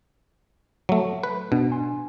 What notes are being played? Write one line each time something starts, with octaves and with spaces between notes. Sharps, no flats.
F#3 A3
B4
B2 D4
G#5 C6